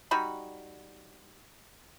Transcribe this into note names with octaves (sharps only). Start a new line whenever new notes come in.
G3 D#4 F#4 B5